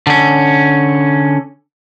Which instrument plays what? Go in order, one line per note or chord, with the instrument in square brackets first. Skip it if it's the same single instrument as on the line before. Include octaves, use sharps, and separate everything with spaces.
[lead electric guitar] D3 C#4